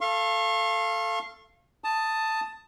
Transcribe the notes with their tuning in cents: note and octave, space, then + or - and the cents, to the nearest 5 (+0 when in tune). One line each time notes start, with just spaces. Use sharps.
A4 +0 F5 -15 C#6 -40
A5 +10 D#6 +0